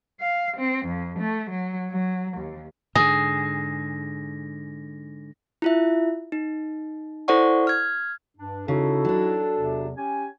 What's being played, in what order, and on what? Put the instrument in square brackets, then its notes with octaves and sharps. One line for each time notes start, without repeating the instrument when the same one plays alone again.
[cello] F5
C4
F2
A3
F#3
F#3
D#2
[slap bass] G#2 D3 [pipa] G#4 [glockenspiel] A#6
[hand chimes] E4 F4 E5
D#4
E4 A4 C5 D5 F#5 C#6
F6 G#6
[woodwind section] G2 D4
[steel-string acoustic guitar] C#3 [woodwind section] D#4 E4 F#4 [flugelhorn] A4
[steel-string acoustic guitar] F#3 D4
[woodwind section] E2 C3
C#4 G4 G#5